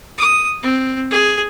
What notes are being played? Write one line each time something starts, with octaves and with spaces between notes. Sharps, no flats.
D#6
C4
G#4